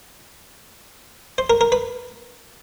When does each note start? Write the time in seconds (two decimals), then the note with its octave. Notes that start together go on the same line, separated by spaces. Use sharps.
1.38 C5
1.50 A#4
1.61 A#4
1.72 B4